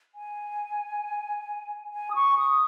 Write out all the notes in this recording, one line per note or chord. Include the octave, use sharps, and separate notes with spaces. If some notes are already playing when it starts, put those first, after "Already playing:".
G#5
G#5
D#6
C#6
D#6